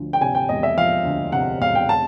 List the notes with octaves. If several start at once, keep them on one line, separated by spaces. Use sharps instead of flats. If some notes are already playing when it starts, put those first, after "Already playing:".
Already playing: D2 F3
G5
C3 G#5
G5
E1 D#5
E5
F3 F5
D2
C3 F#5
E1 F5
G5
A5